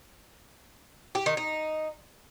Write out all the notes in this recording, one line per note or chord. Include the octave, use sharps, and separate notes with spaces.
G4
D#3
D#4